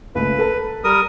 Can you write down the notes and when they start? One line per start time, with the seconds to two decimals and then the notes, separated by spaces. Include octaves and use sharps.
0.15 C#2 A3 B4
0.39 A4 A#4 A5
0.84 G3 A#4 D#6